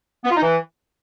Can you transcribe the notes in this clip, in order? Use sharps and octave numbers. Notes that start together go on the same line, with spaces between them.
B3
F4
D#4
E3